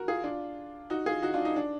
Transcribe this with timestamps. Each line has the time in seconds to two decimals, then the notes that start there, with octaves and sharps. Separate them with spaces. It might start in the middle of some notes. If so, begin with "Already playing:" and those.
Already playing: F#4 A#4
0.08 F4 G#4
0.24 D4 F4
0.90 D#4 F#4
1.06 F4 G#4
1.22 D#4 F#4
1.34 D4 F4
1.45 D#4
1.56 D4